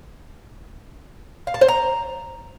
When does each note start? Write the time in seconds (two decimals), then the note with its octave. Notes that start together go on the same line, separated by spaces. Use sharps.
1.47 F5
1.54 A5
1.61 C5
1.68 A#5